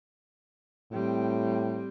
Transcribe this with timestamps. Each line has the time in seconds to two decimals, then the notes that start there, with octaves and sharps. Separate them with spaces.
0.92 A2 G3 C4